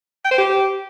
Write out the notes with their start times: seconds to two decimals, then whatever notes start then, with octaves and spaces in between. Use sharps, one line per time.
0.25 G5
0.32 C5
0.38 G4